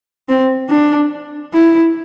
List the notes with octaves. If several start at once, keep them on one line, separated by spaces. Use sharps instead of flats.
C4
D4
E4